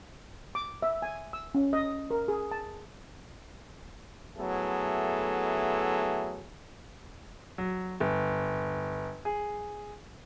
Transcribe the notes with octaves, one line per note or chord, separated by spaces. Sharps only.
D6
E5
G#5
E6
C#4
D#5
A#4
G#4
A5
F#3 A3 B3 E4 G#4 A4
F#3
G1
G#4